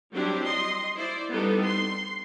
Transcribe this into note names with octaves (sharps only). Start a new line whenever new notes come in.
F#3 G3 C4 D4 E4 G4
D#5 C6
E4 C5 D5
G3 B3 C4 D4 D#4 A4
C6